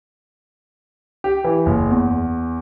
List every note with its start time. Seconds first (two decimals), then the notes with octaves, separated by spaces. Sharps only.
1.24 G4
1.44 E3
1.66 F#1
1.90 E2